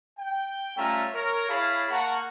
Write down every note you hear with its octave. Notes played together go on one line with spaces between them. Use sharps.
G5
G3 A3 C#4 F4 E5 A#5
A#4 C#5
E4 G#4 C#5 F5 A5 B5
A#3 F#5 A5 A#5 C#6